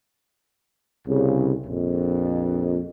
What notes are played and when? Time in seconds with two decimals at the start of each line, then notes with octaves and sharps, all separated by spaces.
1.07 C2 C#3
1.67 A#1 F2